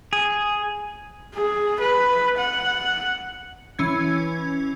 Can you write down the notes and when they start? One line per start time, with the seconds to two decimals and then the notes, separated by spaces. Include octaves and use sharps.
0.13 G#4
1.34 G#4
1.80 B4
2.38 F#5
3.79 E3 C#4 G#6